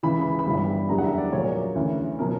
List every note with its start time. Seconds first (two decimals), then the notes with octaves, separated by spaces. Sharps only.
0.03 C#2 C#3 E3 B5
0.21 B5
0.39 B5
0.46 G1 G2 E3 G3
0.57 B5
0.89 F#1 E2 D3 G3 A#5
0.98 F#5
1.04 E5
1.18 D5
1.32 A#1 A#2 F#3 C#5
1.75 D2 C#3 E3
2.19 B2 F#3 A#4